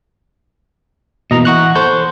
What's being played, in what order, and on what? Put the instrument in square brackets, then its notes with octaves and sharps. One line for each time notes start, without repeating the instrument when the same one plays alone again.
[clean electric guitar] B2 E3 A#3 [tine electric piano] D#5 A#5
[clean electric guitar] E3 [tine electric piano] F#5 C#6 F#6
[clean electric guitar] A4 B4 [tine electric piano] C5 C#6 G6